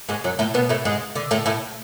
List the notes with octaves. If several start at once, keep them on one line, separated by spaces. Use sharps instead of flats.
G#2 G#3
F#2 F#3
A2 A3
B2 B3
A2 A3
G#2 G#3
D3
A2 A3
A2 A3